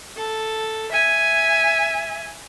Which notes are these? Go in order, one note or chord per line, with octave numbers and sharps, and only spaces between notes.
A4
E5 G#5